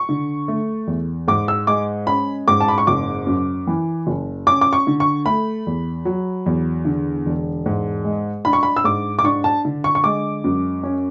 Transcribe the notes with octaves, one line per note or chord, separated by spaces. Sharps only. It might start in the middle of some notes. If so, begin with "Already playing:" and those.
Already playing: C#6
D3
A3
E2
G#2 D6
E6
G#3 D6
C#4 B5
G#2 D6
A5
B5
C#6
F#1 D6
F#2
E3
F#1
C#4 D6
D6
C#6
D3
C#6
A3 B5
E2
F#3
E2
D3
E1
G#2
G#3
D4 B5
C#6
B5
E6
G#2 D6
D6
D4 C#6
A5
D3
C#6
C#6
G#3 D6
F#2
C#4